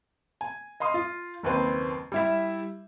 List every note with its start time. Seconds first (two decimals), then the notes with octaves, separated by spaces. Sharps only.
0.41 G#5
0.80 D#5 F5 C6 D#6
0.94 F4
1.43 F#1 D#2 C4 B4 C5
2.12 G3 E4 E5